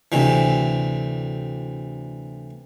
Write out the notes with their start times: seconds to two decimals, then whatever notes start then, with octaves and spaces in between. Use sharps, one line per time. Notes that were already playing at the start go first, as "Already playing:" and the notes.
0.12 D2 C3 E3